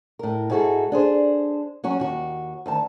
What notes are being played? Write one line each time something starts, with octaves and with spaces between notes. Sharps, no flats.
A2 A#4
G#2 E4 F#4 G#4 A4
D4 G#4 C5
F#3 C#4 F#4
D#2 F#4
D2 D#3 A5